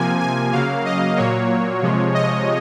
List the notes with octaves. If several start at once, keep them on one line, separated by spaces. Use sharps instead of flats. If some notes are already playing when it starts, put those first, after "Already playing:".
Already playing: C3 F3 A#3 G#5
G#5
C#3 F#3 A#3 F5
D#5
A#2 F#3 A#3 C#5
C3 F3 G#3
D#5